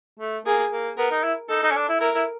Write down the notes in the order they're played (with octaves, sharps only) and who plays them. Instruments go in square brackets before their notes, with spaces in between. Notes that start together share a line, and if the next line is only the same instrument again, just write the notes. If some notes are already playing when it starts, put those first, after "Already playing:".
[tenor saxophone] A3
[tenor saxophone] A#3 [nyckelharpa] G#4
[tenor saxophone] A#3
[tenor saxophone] B3 [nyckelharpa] A#4
[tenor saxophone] D#4
E4
[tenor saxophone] D#4 [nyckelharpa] A4
[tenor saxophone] D#4
C#4
D4
E4
[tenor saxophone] E4 [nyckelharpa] A#4
[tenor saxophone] E4